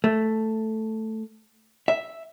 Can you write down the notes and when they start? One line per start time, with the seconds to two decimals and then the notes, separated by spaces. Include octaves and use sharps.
0.04 A3
1.88 E5